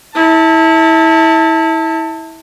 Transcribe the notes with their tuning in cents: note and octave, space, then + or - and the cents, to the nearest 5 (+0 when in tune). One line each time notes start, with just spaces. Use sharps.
E4 -25 A5 +25